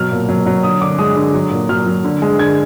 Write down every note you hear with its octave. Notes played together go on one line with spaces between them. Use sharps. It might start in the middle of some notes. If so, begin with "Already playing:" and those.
Already playing: B2 F#3 F6
A#2
F#3
F#3
D3 D#6
D3 D6
G#3 D#6
D3
F#3
A#2
F#3 F6
F#3
D3
G#3
D3 G#6